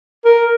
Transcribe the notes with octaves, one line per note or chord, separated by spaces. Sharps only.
A#4